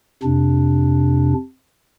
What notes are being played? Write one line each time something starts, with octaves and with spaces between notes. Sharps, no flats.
F2 C3 D4